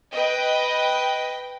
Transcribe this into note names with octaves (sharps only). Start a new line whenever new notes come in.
B4 D#5 G5